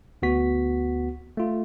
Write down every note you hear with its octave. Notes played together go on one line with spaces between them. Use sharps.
D2 B3 F#4 B6
A3 F4